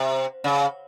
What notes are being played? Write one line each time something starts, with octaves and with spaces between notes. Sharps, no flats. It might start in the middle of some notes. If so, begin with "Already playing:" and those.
Already playing: C3
C#3